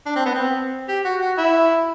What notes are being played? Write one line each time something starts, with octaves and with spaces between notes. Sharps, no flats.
D4
C4
B3
C4
G4
F#4
F#4
E4